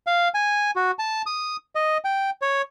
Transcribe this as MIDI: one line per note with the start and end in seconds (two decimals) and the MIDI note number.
0.07 0.28 77
0.34 0.71 80
0.76 0.91 66
0.99 1.22 81
1.26 1.57 87
1.75 1.98 75
2.05 2.30 79
2.42 2.62 73